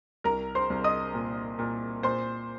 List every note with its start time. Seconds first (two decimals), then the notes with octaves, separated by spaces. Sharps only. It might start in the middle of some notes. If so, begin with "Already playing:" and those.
0.24 C2 A#4 A#5
0.55 C5 C6
0.70 C2
0.84 D#5 D#6
1.14 A#2
1.59 A#2
2.03 A#2 C5 C6